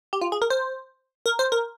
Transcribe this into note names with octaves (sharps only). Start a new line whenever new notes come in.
G4
F4
G#4
A#4
C5
A#4
C5
A#4